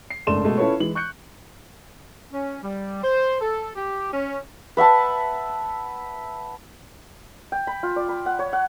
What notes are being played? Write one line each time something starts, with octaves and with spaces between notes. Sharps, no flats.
C7
F#1 G#2 A3 D4 C6 E7
B2 G#3 A3
C#4 E4 F4 A4 B4 C#5
E3 G#3 F#7
C#6 F#6 G6 C#7
C#4
G3
C5
A4
G4
C#4
B4 E5 F#5 A5
G5
B5
F4
D5
B5
F#5
C#5
F#5